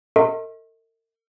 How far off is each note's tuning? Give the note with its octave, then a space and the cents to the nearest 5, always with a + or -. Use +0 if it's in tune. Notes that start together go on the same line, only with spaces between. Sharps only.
A#4 -45 D#5 +40 C#6 -40